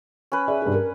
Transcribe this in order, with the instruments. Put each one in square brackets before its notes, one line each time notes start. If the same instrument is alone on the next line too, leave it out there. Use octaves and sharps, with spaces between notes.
[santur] C#4 B4
[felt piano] G#4 D5 E5
G2 G#4
A#4